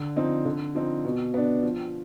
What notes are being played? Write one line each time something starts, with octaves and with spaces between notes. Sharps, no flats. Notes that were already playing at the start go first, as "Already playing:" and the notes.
Already playing: D3
F3 C4 D#4
D3
F3 C4 D#4
B2
B3 D4
F3